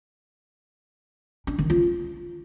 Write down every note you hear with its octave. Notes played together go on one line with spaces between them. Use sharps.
D4
D#3
F4